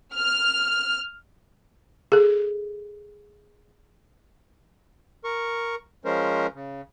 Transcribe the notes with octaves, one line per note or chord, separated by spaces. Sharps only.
F6
G#4 A4
A#4 C#6
F3 G#3 C#4 A#4 C5
C#3